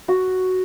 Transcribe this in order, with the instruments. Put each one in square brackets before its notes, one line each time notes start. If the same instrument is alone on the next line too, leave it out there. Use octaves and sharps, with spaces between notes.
[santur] F#4